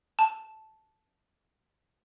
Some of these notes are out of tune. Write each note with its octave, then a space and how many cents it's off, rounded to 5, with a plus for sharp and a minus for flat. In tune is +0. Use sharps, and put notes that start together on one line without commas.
A5 -10